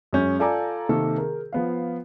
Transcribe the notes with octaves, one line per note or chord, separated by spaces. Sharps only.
F#2 G#3 C#4 G6
F4 A4 D5 G#5 A#5 D6
C3 D#3 A#3 A4 A#4
G#4 A#4
F3 B3 F5